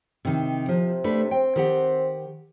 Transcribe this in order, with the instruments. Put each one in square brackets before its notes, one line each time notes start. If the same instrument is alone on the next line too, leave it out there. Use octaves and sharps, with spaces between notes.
[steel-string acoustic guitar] C3 D#3 D#4
[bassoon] C3 [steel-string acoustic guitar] F3
[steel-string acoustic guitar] A3 D4 B4
[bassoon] C4 [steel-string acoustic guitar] G5
[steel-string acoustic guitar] D#3 G4 F#5